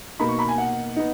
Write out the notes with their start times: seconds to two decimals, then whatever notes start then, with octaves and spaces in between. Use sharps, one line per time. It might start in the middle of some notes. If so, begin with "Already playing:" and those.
0.20 B2 A#3 D#4 B5
0.29 C#6
0.39 B5
0.48 G#5
0.58 F#5
0.96 B3 D#4